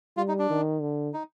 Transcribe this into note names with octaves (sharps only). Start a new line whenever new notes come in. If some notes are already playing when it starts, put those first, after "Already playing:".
G3 F4
D#4
D4
D#3
D3
D#4